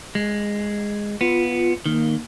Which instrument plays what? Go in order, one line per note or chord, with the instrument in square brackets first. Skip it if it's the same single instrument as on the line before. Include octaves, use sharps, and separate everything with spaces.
[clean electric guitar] G#3
[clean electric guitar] B3 [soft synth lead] F4
[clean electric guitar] D#3 [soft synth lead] A#3